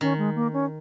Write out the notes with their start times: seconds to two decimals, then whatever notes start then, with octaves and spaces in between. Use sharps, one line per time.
0.01 D#3 C#4
0.18 G#3
0.35 A#3
0.53 C#4